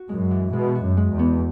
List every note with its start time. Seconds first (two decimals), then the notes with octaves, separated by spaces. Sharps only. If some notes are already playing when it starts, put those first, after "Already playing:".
Already playing: F#4
0.09 F#2 G#3
0.31 E3
0.53 B2 G#3
0.75 F#4
0.83 F#2
0.97 G#3
1.12 E2
1.19 B3